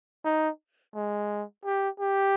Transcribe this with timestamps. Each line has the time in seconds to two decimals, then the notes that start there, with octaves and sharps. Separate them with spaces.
0.25 D#4
0.94 G#3
1.65 G4
2.00 G4